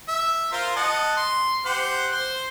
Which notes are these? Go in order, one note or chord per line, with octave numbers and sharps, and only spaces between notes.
E5
F4 A#4 C5
D#5 F#5 A5
C6
G4 C5 F#5
C5 C6